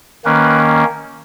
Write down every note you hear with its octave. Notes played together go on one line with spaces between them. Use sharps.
D#3 A#3 C#4 B4